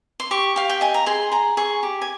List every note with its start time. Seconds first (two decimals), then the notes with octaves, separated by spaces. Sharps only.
0.20 C6
0.31 G4 C#6
0.56 G4 F5
0.69 G5
0.81 D#5 G#5
0.94 A#5
1.06 G#4 C6
1.32 G#4 A#5
1.57 G#4 C#6
1.83 G4
2.02 G#5